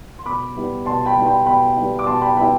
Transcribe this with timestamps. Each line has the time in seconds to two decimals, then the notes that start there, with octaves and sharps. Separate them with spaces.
0.19 C6
0.26 B2 B5 D6
0.56 G3 B3 E4
0.86 B2 A5 C6
1.06 G5 B5
1.16 G3 B3 E4
1.26 G5 B5
1.46 B2 G5 B5
1.76 G3 B3 E4
1.99 D6
2.06 B2 A5 C6
2.22 G5 B5
2.37 G3 B3 E4 G5 B5